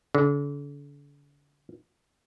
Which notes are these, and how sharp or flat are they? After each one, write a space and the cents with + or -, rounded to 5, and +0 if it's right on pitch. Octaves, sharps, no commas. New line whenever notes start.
D3 -40